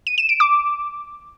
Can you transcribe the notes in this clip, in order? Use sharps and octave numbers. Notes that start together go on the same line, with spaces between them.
D#7
E7
D7
D6